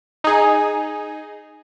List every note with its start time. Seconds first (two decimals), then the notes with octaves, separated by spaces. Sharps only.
0.24 D#4 G#4